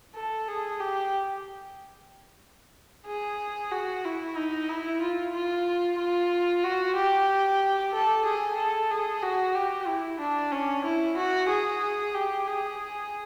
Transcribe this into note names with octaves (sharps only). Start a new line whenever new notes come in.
A4
G#4
G4
G#4
F#4
E4
D#4
E4
F4
F4
F4
F#4
G4
A4
G#4
A4
G#4
F#4
G4
E4
D4
C#4
E4
F#4
G#4
G4
G#4